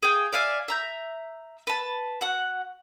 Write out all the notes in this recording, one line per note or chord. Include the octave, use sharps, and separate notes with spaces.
G#4 F5 G5
D5 E5 F5 G#5
E5 A#5 G6
B4 A5
F#4 F#5